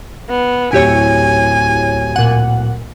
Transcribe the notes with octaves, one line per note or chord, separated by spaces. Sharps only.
B3
D1 E4 G4 C#5 G#5
A#2 F#5